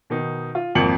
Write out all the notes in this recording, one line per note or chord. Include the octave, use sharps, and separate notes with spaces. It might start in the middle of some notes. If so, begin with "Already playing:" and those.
B2 D#3 D#4
F4
G#1 F2 A#3 C#7 F#7